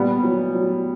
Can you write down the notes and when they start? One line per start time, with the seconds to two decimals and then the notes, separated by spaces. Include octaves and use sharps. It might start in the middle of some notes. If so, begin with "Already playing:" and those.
Already playing: A#2 G3 B3
0.23 F#3
0.54 F#3